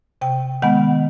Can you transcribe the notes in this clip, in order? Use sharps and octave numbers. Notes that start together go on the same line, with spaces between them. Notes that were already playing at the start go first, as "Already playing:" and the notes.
C3 G5
D#3 G#3 B3 F#5